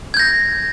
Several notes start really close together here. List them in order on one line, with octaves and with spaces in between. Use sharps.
G#6 G6 A#6